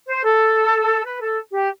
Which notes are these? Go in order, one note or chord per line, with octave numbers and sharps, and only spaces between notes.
C5
A4
B4
A4
G4